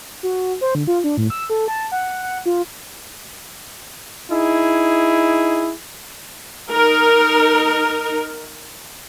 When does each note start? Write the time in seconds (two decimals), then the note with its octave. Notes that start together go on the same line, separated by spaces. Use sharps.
0.23 F#4
0.61 C5
0.75 D3
0.87 F4
1.04 D4
1.17 A2
1.30 E6
1.50 A4
1.68 A5
1.92 F#5
2.23 F#5
2.46 F4
4.30 D#4 E4 G#4
6.71 D#4 A#4